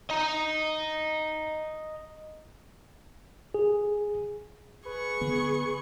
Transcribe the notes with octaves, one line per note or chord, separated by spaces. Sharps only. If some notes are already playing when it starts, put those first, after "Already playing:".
D#5 A#5
G#4
G#4 B4 C#6
D3 B3